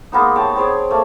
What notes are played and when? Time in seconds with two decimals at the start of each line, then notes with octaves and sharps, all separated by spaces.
0.12 G#3 A#3 B3 D#4
0.36 G4 C#5 A5 C#6
0.56 C4 G#4 C#5 D5
0.91 A3 A#3 D5